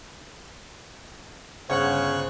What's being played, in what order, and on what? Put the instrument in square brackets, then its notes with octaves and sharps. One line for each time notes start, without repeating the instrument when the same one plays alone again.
[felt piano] G1 F#5 [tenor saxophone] C#3 [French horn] C5 [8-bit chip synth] C#5 C#6 F#6